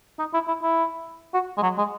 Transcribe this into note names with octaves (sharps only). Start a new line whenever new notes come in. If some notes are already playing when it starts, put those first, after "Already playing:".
D#4
E4
E4
E4
F#4
G#3
F#3
G#3